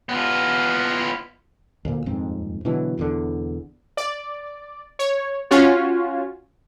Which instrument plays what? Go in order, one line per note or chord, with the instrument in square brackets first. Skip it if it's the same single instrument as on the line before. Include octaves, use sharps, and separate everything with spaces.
[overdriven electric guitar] B3 F4
[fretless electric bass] D2 A#2
D#1 F2 G#2 C4
B2 D3 E3 F#3
E1 E2 A#2 D3
[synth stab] D5
C#5
C#4 F4 F#4 C#5